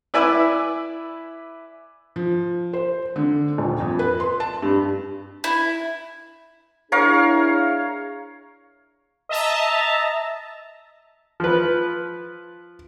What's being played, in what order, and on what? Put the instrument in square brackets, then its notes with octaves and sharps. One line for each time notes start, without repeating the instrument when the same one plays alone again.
[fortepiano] E4 B4 D5 G#5 D6 E6
[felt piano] F3
C5
D3
D#1
F2
B4
C6
A5
G2
[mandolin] E4
[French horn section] D4 E4 G#4 [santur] A#4 C#5 F5
[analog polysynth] D#5 E5 A5 A#5
[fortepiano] F3 B4